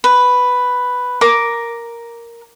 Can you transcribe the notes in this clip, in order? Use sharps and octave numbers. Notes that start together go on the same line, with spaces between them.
B4
A#4 D6